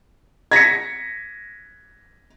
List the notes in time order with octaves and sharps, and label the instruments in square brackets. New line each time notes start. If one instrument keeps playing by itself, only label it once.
[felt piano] G#6 A#6 B6 C#7